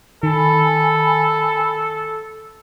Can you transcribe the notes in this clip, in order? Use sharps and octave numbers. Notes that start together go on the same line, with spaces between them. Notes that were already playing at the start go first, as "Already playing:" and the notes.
D#3 A4 G#5 B5